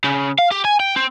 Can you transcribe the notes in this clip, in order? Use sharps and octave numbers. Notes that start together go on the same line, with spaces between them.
C#3
F5
G4
G#5
G5
C4